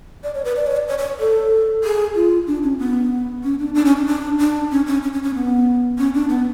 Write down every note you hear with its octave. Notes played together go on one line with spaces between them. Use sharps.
D5
C#5
B4
D5
C#5
D5
C#5
C#5
A4
G#4
F4
D4
C#4
B3
C#4
D4
D4
C#4
D4
D4
D4
C#4
C#4
C#4
C#4
C#4
B3
C#4
D4
B3